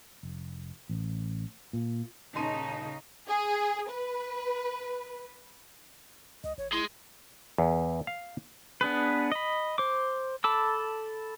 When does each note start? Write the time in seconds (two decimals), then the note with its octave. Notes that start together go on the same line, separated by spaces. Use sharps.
0.23 F1
0.89 A1
1.73 A#2
2.35 D#1 C#3 D#4 A5 C6 D#7
3.28 G#4
3.90 B4
6.44 C#2 D#5
6.58 G#1 C#5
6.73 E4 G#4 C6
7.58 E2
8.07 F5
8.81 B3 D4 G#4 B4
9.32 D#5 B5
9.78 C5 D6
10.44 A4 A5 B5 D6 E6